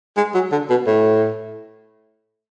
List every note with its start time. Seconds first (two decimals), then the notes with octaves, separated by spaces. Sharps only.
0.17 G#3
0.35 F#3
0.52 D3
0.70 B2
0.87 A2